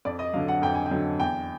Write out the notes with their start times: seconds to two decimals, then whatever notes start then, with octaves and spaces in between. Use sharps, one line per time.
0.05 F2 D5
0.19 D#5
0.33 D3 F#3 F5
0.48 F#5
0.62 F2 G5
0.75 G#5
0.86 G5
0.91 D3 F#3
1.20 E2 G5